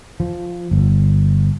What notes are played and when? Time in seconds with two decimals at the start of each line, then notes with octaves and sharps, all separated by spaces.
0.20 F3
0.71 G1